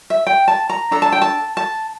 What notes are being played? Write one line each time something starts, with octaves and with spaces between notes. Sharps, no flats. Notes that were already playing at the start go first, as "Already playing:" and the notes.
E5
G5
A5
A#5
D4 A4 A#5
A5
G5
A5
A5